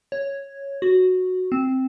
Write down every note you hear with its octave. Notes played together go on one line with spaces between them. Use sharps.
C#5
F#4
C4